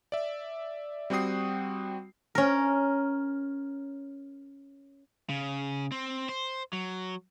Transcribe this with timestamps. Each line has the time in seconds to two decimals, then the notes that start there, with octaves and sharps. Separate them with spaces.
0.12 D5 E5
1.10 G3 C4 F#4 G5 D#6 C7
2.35 C#4 A#4
5.29 C#3
5.92 C4
6.29 C5
6.73 F#3